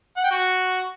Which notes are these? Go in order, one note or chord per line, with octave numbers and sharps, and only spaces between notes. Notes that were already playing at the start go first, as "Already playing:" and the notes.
F#5
G5
F#4